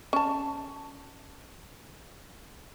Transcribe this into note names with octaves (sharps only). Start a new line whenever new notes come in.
C#4 A5